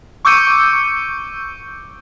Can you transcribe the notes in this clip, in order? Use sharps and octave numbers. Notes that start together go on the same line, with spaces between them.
C#6 D6 E6 G6 C#7 D#7